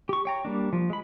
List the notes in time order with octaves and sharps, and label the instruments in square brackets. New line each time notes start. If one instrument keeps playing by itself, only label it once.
[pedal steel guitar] G4 C#6
C#5 G5 A#5
G3 A#3 D4
F3
G#3 B5